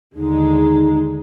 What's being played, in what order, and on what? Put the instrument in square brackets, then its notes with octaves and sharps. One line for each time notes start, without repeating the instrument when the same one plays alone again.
[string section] D#2 D3 G#3 [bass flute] D#4